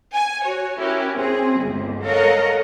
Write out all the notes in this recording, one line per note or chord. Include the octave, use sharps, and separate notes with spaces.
G#5
F#4 C#5
C#4 E4 F#4 G4 A#4
C4 G#4
G1 C#2
A4 A#4 C#5 D#5 F5 F#5